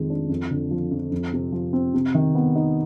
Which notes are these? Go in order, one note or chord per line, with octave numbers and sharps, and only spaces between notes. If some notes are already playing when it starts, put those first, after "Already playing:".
Already playing: F2 D#3 G#3
D4
F2
D3
F3
F2
F2
C3
F3
C4
C3
D#3
B3
D#4